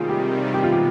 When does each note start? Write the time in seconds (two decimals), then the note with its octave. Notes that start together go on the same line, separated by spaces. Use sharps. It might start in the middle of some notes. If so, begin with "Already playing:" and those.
Already playing: C3 D#3 G3 F4 G#4
0.09 G4
0.54 B2 G#3 B3 G4
0.63 F4
0.72 G4